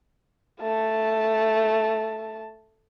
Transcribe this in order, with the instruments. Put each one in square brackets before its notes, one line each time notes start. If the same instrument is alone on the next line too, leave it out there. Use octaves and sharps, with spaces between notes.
[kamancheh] A3 A5